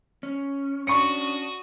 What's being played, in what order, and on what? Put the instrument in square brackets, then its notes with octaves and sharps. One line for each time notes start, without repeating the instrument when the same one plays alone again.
[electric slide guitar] C#4
[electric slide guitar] C#4 D4 [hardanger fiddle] F#4 D#6 [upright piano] C#6 C#7